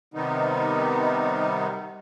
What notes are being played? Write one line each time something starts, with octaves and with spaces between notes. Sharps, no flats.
C3 D#3 G3 B3 D#4